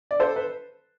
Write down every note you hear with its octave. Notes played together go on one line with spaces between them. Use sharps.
D5
A4 C5
B4